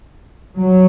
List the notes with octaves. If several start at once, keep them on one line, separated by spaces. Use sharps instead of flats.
F#3